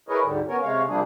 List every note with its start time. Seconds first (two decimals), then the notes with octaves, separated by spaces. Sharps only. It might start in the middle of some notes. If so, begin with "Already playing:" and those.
0.09 E4 G#4 A#4 B4 C#5 D#5
0.23 D2 G#2 D3 G3
0.48 B3 C#4 A#4 C#5
0.61 C3 G#3 C#5 F5
0.88 C3 F3 G3 A#3 D4 G#4